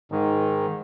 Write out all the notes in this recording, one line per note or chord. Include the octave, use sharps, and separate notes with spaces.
G#2 D#3